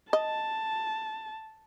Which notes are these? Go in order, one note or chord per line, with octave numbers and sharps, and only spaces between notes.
D#5 A5